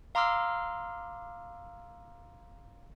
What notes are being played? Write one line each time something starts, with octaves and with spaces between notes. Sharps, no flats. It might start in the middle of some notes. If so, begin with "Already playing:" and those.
F5 A#5 C6 D6 E6 F6